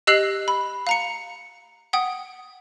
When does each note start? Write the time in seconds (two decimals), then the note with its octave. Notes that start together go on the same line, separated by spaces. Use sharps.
0.07 G4 D#5 E6 F#6 C7 F#7
0.48 B5
0.87 F5 A#5 C#7
1.93 F#5 G5 D#6